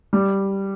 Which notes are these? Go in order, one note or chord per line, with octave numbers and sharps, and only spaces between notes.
G3